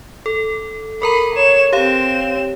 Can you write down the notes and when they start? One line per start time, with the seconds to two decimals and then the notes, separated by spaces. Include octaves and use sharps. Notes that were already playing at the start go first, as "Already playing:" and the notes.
0.26 A4
1.02 A4 A#4 A#5 B5
1.35 C#5 E7
1.73 C4 G4 C#5 F5 E7